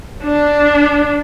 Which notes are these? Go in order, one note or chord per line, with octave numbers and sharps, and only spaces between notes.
D4